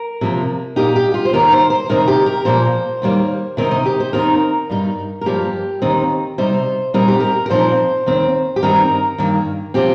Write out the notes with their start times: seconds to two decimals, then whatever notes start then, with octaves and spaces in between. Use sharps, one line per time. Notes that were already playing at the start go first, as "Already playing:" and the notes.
Already playing: A#4
0.21 C3 F3 A#3
0.76 A#2 A#3 D#4 G4
0.96 G4
1.14 F4
1.25 C5
1.33 D#2 D#3 A#3 D#4 A#4
1.52 C5
1.70 C5
1.89 C3 D#3 C4 D#4 A#4
2.08 G4
2.26 A#4
2.45 A#2 F3 A#3 C5
3.02 D#2 D#3 G3 A#3
3.57 C3 D#3 C4 D#4 A#4
3.71 D#5
3.86 G4
4.00 C5
4.13 D#2 D#3 C4 D#4 A#4
4.70 G2 G3 D#4
5.21 A#4
5.26 G2 F3 A#3 G4
5.82 D#2 D#3 C4 D#4
6.38 C3 G3 D#4 C5
6.94 A#2 G3 C4 D#4 A#4
7.08 G4
7.20 A#4
7.46 A#4
7.50 A#2 F3 C4 D#4 C5
8.06 D#2 D#3 C4
8.56 G4
8.63 G2 D#3 C4 D#4 A#4
9.18 G2 D#3 A#3
9.74 C3 F3 C4 G4